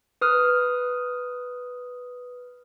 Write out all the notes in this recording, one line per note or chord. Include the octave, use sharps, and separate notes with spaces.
B4 D#6 F6